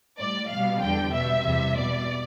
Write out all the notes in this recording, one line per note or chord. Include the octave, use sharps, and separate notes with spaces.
A2 G3 D5
B2 G3 F5
E2 D3 G3 G5
B2 G3 E5
E2 C3 G3
B2 G3 D5